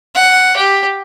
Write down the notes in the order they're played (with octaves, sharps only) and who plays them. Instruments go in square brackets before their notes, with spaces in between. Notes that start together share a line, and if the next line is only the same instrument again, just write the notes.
[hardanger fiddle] F#5
G4